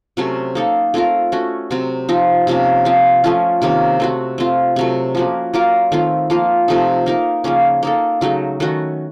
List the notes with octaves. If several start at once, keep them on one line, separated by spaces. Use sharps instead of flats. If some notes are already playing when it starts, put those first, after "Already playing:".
C3 F#3 A3 C#4
A#3 D#4 A4
A3 C4 F4 A#4
A3 C#4 F#4
C3 F#3 C4
F3 C4 D#4
C3 F3 A#3 C#4
F3 C4 F4
F3 A3 C#4 F4
C3 D#3 A#3 C#4
A3 C4 F#4
A3 C4 F4
C3 F#3 A3
F3 A#3 C#4 F#4
F#3 A#3 F4 A#4
D#3 A3 C4 F4
F3 A#3 F4
C3 F3 A3 D#4
A#3 D#4 A#4
C#3 F3 A#3 C#4
A#3 D#4 A4
C#3 F#3 A3 D#4
D#3 A3 C#4 F#4